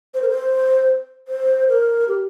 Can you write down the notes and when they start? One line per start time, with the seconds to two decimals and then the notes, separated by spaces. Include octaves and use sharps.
0.14 C5
0.22 A#4
0.30 C5
1.28 C5
1.69 A#4
2.08 G4